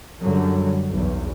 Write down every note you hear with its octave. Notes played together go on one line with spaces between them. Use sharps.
F#2 D3 F#3 G3
B1 E2